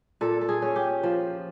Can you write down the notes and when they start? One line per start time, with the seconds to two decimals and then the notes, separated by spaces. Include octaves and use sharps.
0.21 A#2 A4
0.41 A4
0.49 G#4
0.62 C#4
0.76 G4
1.03 F3